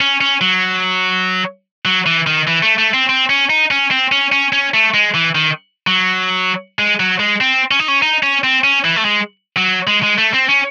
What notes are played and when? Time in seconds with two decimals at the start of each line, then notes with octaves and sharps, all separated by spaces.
0.01 C#4
0.21 C#4
0.41 F#3
1.85 F#3
2.06 E3
2.27 D#3
2.47 E3
2.63 A3
2.78 A3
2.94 C4
3.09 C4
3.30 C#4
3.50 D#4
3.71 C#4
3.91 C4
4.12 C#4
4.32 C#4
4.53 C#4
4.74 A3
4.94 G#3
5.14 E3
5.35 D#3
5.87 F#3
6.79 G#3
7.00 F#3
7.20 G#3
7.41 C4
7.71 C#4
7.79 D#4
7.88 C#4
8.02 D#4
8.23 C#4
8.44 C4
8.64 C#4
8.85 E3
8.96 A3
9.05 G#3
9.57 F#3
9.87 G#3
10.03 G#3
10.18 A3
10.34 C4
10.49 C#4